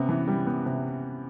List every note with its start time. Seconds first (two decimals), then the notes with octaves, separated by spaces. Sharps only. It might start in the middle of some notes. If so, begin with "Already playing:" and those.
Already playing: C3 B3 C#4
0.09 E3
0.28 G3
0.47 B3
0.66 C3